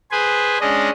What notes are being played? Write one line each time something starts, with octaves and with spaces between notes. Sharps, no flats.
G#4 B4 C5 G#5
G#3 C#4 D4 D#5